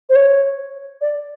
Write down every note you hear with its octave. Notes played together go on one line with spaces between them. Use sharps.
C5
C#5
D5